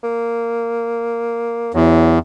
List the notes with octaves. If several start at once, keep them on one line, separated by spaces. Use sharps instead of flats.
A#3
E2 F#3